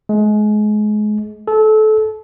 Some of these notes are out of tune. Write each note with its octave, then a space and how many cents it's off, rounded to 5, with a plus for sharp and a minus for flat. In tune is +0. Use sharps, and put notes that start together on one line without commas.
G#3 +30
A4 -25